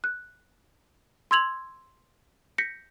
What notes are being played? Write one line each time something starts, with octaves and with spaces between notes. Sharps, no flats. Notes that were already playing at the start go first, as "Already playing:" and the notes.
F#6
C6 E6 G#6 F7 F#7
G6 A#6 B6 C#7